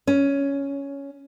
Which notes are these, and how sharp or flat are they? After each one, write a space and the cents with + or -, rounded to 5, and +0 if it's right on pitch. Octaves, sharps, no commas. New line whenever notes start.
C#4 +10